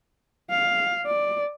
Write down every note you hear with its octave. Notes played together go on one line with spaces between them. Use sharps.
F5
D5